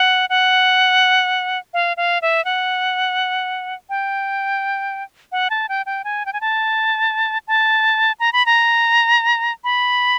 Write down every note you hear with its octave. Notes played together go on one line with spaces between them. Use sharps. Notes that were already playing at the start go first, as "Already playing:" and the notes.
Already playing: F#5
F#5
F5
F5
E5
F#5
G5
F#5
A5
G5
G5
G#5
G5
G#5
A5
A5
A#5
B5
A#5
B5